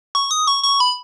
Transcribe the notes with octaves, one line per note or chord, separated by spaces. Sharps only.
C#6
D#6
C#6
C#6
B5